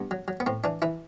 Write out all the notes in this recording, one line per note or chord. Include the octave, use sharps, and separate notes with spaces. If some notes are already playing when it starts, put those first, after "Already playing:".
Already playing: G2 B3
F#3
F#3
B3
A2 C4
E3 D4
E3 E4